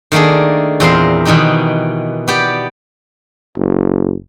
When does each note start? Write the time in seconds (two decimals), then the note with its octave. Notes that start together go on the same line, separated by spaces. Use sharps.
0.12 D#3 A3 A#3 D4 G#4
0.80 E2 A#2 C4 A#4 F5 C6
1.25 B2 D#3 E3 D#4 G4
2.28 B3 G4 D5
3.58 F#1